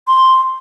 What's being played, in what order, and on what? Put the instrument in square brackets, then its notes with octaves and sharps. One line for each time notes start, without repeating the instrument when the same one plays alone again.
[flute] C6